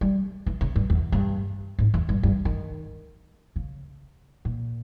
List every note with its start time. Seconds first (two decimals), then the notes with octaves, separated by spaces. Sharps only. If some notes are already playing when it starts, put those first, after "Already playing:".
0.01 G3
0.47 E3
0.61 C#3
0.76 G2
0.90 E2
1.12 G2
1.79 G#2
1.94 E2
2.09 G2
2.23 G2
2.45 D#3
3.56 C#3
4.45 A#2